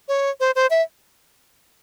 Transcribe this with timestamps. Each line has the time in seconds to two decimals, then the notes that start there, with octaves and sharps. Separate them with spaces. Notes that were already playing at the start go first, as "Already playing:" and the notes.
0.08 C#5
0.40 C5
0.56 C5
0.70 E5